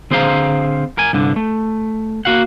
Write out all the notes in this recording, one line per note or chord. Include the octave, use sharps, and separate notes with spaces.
D3 C4 G#4 C5 F5 A#5
A#4 G#5
C2 G2 D3
A3
A#3 F#4 F5 F#5